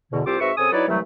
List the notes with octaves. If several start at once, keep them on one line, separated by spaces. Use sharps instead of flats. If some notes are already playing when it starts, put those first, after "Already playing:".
E2 B2 D3
C2 C4 F4 G4 C5 D6
G#2 C4 F#4 B4 E5 C#6
C#3 C4 A4 G#5 D#6
F#3 D#4 E4 B4 C#5 D5
C2 E3 F#3 G3 A3